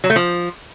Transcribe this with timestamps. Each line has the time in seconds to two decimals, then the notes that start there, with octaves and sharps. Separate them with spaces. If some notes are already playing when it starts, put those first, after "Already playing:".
0.04 F#3
0.10 A3
0.16 F3